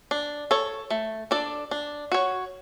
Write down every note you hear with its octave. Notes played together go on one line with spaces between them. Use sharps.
D4
A4 C#5
A3
D4 A4 D5
D4
F#4 C#5